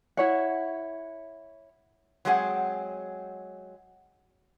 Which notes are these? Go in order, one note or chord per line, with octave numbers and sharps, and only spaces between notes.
E4 C#5 F#5
F#3 G#3 C4 G#4 F#5